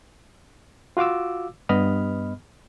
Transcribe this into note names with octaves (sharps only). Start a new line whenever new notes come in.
F4 F#4 F5 D6 E6
G2 B3 D#5 B5 F6